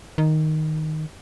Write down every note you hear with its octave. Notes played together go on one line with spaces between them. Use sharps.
D#3